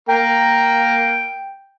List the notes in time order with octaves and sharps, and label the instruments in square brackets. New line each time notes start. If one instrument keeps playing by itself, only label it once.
[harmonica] A#3 A#5 [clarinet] G5